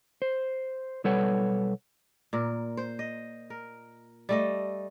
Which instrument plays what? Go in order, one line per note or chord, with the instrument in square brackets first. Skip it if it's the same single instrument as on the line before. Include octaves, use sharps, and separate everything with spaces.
[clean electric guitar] C5
B1 G3 A4 B4 C#5 F#5
[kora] A#2 A#4
C5
D#5
A#4
G3 A3 D#5